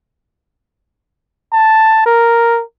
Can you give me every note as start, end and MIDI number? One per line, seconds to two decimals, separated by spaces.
1.52 2.05 81
2.06 2.62 70